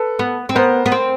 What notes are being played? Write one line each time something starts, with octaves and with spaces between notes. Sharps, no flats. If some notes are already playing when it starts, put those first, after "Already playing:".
Already playing: A4 B4
B3
C4
B3 A#4 C5
B3
C4